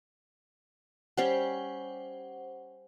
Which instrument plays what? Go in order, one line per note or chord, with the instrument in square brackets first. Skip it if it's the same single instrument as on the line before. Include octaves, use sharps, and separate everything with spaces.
[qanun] G3 C#4 G4 [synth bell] C5 F#5